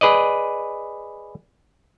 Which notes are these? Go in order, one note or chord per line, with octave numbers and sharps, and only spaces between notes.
G#4 B4 D5 D#5